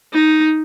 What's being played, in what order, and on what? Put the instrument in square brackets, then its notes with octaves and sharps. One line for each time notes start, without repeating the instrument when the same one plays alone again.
[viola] D#4